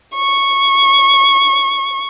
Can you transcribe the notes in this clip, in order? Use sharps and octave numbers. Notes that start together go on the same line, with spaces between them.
C#6